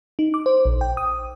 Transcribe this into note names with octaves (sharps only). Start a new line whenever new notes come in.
D#4
D6
C5
A#1
G5
D#6